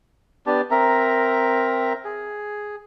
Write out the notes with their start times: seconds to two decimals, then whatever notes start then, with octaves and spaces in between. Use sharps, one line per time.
0.47 B3 D4 G4 A5
0.71 C4 A#4 E5 A#5
2.05 G#4